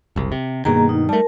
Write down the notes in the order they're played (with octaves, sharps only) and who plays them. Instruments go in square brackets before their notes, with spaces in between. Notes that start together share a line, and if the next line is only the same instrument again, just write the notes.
[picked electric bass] F#1 C2
C3
[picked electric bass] G2 B2 D#3 [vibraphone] A#3 G#4 A#5
[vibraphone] D#4
[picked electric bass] G3 A3 [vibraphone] A#4 A5